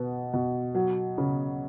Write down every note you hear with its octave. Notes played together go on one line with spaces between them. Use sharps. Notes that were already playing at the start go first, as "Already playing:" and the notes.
Already playing: B2 B3
B2
F#3
C#3